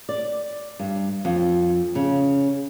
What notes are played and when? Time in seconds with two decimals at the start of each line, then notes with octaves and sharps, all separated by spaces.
0.09 D5
0.79 G2
1.25 F2
1.95 C#3